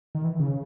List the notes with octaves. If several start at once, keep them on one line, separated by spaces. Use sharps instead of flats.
D#3
E3
C#3